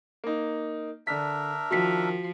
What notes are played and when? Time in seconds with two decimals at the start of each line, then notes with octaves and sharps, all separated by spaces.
0.24 A#3 D#4
1.07 D3 D4 A#4 E5 B6
1.71 D#3 F3 F#4 B6